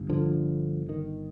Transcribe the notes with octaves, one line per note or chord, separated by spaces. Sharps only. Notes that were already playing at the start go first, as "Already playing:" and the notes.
Already playing: G1 G2
D3 F3
D#3